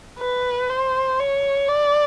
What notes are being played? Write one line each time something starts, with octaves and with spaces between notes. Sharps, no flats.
B4
C5
C#5
D5